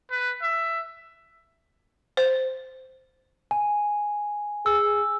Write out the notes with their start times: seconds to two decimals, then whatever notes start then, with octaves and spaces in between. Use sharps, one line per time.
0.11 B4
0.42 E5
2.17 C5
3.51 G#5
4.66 G#4 E6